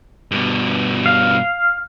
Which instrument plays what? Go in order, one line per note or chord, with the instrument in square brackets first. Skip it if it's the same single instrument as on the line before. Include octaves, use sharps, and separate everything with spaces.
[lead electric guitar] G2 B2
[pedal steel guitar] F5